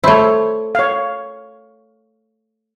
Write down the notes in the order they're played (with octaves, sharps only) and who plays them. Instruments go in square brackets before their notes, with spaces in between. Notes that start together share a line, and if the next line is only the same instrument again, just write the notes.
[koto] A3 E4 [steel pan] C5 C#5
[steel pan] C#5 F5